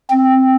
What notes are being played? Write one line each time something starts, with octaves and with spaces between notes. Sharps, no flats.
C4